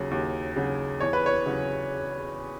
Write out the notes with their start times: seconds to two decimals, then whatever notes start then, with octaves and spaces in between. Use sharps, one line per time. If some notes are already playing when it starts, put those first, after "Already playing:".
Already playing: D#2 C#3 F#3
0.11 D#2
0.56 C#3 F#3
1.00 E2 C#5
1.13 B4
1.26 C#5
1.46 C#3 F#3 C#4